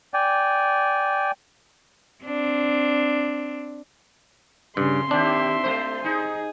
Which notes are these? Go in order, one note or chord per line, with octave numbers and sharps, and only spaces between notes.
D5 G5 G#5
C4 D4
G2 C#3 C6
D#2 C4 D4 G4 E5
A3 C5
D#4 G#4